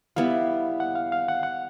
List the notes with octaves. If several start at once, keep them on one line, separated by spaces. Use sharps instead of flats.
G3 B3 E4 F5
F#5
F5
F5
F#5
F#5